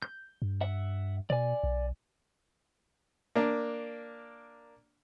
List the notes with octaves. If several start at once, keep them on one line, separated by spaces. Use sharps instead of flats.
G6
G2
E5 F#5
B2 D5 G#5
B1
A#3 D4